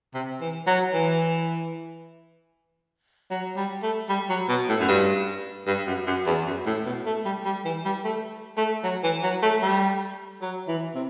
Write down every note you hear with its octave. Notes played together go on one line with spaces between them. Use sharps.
C3
E3
F#3
E3
F#3
G3
A3
G3
F#3
B2
A2
F#2
G2
G2
F#2
F#2
E2
F#2
A2
B2
A3
G3
G3
E3
G3
A3
A3
F#3
E3
F#3
A3
G3
F#3
E3
C3